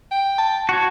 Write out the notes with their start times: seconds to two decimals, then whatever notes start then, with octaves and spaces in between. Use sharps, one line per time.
0.11 G5
0.38 A5
0.69 F#4 C#5